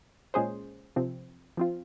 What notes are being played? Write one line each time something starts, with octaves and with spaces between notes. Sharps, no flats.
A#2 G#3 C#4 G#4 C5
C3 F3 C4
F3 C4 F4